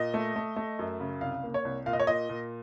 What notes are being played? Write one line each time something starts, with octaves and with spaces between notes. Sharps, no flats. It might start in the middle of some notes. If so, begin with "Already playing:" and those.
Already playing: A#2 D#5
A3
A3
A3
F#2
C#3
C2 F5
A#3
C#5
C2
A#2 F5
D#5
C#5
A#2 D#5
A#2